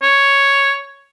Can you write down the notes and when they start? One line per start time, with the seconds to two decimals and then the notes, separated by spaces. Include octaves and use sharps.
0.02 C#5